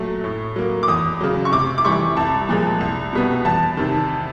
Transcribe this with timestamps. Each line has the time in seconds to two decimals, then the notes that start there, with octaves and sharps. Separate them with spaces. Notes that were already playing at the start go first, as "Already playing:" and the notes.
Already playing: A#2 F#3 A3
0.24 A2
0.56 F#3 A#3
0.83 D6
0.88 E2 D#6
1.21 C#3 F#3
1.45 C#6
1.52 C3 D6
1.78 D6
1.85 E3 G3 C#6
2.17 C2 A5
2.49 A#2 F3 G#3
2.80 C2
3.13 B2 G3 B3
3.45 E2 A5
3.77 C3 D#3